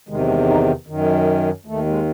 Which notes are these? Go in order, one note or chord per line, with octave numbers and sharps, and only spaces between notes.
E2 C3 D#3 G#3
F#3
G#3
D#4
F#2 D#3
D#2 D#3 A3
G#3